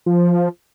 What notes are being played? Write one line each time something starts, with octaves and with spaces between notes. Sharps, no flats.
F3